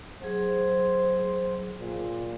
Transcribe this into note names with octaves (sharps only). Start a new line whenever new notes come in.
F#3 G#4 C5
A#2